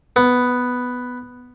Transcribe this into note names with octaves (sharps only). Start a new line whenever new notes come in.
B3